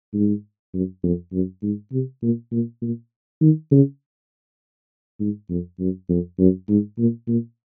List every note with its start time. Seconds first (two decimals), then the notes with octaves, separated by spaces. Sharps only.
0.14 G#2
0.74 F#2
1.04 F2
1.33 F#2
1.63 G#2
1.92 C3
2.22 A#2
2.52 A#2
2.82 A#2
3.41 D#3
3.71 C#3
5.20 G#2
5.50 F2
5.80 F#2
6.09 F2
6.39 F#2
6.69 G#2
6.99 A#2
7.28 A#2